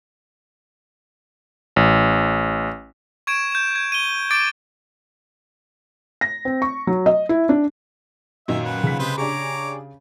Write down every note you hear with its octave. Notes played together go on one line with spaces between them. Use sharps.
A1
C#6 G#6 D7 E7
G6 E7
G#6
D#7 G7
D6 A6 D7
A#6
C4
C#6
F#3
D#5
E4
D4
F#2 A#2 D#3 F#3 D#5 E5
B4 F#5
C#3 B6
C3 G#3 B4 C5
D4 G4 G#4 C#5 A#5 D6